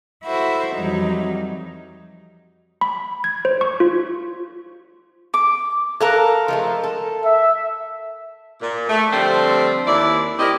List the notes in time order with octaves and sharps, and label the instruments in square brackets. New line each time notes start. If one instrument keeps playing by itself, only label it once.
[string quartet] E4 F#4 A4 C5 E5
F2 E3 F#3 G3 D#4
[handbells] B5
G#6
C5
C#6
F4
[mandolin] D6
[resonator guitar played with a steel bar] A4 [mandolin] A#4 F5 F#6
[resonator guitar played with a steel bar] F3 G#3 A3
A4
[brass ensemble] E5
[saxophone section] A#2
A3
D3 F3 G3 A3 C4
D#2 E4 D5
C4 E4 G4 A#4 D5 D#5